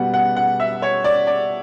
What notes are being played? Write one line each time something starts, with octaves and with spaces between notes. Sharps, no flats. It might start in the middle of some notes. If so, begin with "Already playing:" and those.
Already playing: B2 G3 B3 F#5
F#5
F#5
E5
C#5
D5
D5